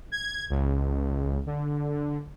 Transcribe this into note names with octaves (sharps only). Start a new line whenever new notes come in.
G#6
C#2
D3